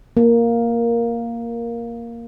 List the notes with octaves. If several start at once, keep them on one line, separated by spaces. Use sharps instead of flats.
A#3